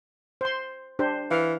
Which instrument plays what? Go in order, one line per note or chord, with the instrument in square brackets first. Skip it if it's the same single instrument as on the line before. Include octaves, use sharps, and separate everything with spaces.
[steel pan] C5 C6
D4 G4 C5
[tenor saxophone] E3 [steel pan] F5